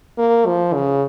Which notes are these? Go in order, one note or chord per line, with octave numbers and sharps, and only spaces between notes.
A#3
F3
C#3